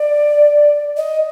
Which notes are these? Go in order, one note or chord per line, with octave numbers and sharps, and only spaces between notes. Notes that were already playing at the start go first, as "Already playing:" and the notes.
Already playing: D5
D#5